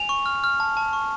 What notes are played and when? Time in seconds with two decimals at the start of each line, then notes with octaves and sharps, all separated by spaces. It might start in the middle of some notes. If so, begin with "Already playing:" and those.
Already playing: G#5 F7
0.09 C#6
0.26 F6
0.44 F6
0.60 A5
0.77 A5
0.93 C#6